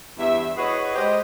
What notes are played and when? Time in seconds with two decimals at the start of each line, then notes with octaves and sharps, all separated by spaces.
0.18 E2 G2 E5
0.57 E4 F#4 G#4 B4 C#5 D#5
0.95 G#3 G4 B4 C5 D#5